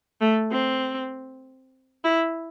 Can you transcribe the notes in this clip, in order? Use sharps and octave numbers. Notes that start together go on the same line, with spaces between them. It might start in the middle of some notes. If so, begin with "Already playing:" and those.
A3
C4
E4